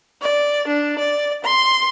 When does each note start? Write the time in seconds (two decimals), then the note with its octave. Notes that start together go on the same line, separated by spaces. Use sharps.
0.22 D5
0.68 D4
0.99 D5
1.44 C6